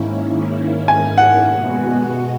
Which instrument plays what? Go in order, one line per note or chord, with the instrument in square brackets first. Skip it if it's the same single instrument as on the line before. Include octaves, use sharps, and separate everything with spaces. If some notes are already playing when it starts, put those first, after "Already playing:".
Already playing: [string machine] G#2 D#3 A#3 C#4 E4
[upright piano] G#5
F#5
[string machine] B2 G#3 B3 F#4